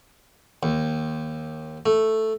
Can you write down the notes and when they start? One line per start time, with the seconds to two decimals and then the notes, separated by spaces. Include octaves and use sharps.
0.63 D#2
1.86 A3